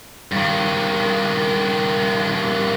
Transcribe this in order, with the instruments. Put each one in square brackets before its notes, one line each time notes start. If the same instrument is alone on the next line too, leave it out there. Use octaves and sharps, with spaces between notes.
[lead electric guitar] G2 D#3